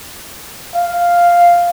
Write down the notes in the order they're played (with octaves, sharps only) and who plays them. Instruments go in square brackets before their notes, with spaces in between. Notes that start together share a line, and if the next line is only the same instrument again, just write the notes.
[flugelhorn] F5